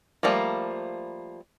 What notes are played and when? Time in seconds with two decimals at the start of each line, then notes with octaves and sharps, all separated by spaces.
0.23 F3 G3 A3 A#3